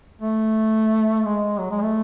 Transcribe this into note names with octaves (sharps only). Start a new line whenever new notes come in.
A3
G#3
F#3
G#3
A3